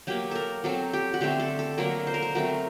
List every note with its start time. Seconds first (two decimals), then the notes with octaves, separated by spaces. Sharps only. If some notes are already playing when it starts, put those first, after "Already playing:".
0.07 F#3 A#3 G4
0.31 A4 A#4
0.64 F#3 C4 A4
0.93 G4
1.14 F#4
1.21 D3 A3 C4 G4
1.40 A4
1.59 A4
1.78 D3 F#3 A#3 A#4
2.07 C5
2.14 A#4
2.22 C5
2.35 F#3 A3 C4 A#4